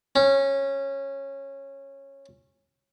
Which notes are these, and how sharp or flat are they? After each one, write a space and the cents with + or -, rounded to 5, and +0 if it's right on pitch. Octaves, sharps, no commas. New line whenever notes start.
C#4 -15